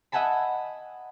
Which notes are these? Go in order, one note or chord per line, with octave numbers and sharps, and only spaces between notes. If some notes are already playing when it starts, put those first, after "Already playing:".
D#5 E5 F#5 G#5 A5 B5